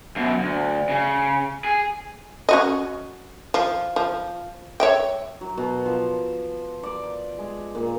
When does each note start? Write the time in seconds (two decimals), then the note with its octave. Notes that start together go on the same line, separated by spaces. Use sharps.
0.16 F#2 B2
0.40 D2
0.89 C#3
1.64 G#4
2.49 C#4 F#4 D#5
3.54 F3
3.96 F3
4.80 C#5 E5 G5
5.41 F#3
5.57 B2
5.86 F3
6.83 D5
7.38 G#3
7.75 A#2